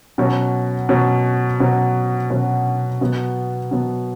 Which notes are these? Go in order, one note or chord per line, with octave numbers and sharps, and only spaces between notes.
B2 F#3 C#4 F#4
B2 F#3 C#4 F#4
B2 F#3 C#4 F#4
B2 F#3 C#4 F#4
B2 F#3 B3
B2 F#3 B3